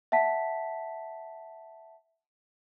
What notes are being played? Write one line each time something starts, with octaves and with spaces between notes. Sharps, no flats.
E5 F#5 A5 B6